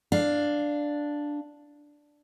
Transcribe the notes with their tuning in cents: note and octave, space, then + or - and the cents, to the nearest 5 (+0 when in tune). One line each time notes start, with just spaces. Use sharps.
D4 +0 F5 +0